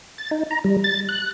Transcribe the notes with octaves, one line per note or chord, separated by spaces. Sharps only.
A6
D#4
A#5
G3
A6
F#6